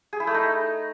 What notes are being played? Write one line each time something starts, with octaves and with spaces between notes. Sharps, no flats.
G#4
E4
A3
D#4